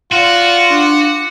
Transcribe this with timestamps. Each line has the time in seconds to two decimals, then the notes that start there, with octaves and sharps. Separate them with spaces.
0.12 F4 F#4 D5 F#5
0.70 D4 F#5